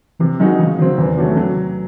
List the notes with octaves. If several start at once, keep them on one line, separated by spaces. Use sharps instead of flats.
C3 E3
D#3 F#3 G#3 D#4 F#4
C#3 E3
D#3 F#3 C4
E2 D#3
C3 F#3 A3 C#4
F#3